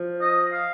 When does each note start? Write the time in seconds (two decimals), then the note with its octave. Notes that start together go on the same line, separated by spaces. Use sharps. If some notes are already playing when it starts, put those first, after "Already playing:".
Already playing: F3
0.21 D#5
0.53 F5